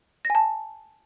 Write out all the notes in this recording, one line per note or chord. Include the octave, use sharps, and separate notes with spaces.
A#6
G#5
A5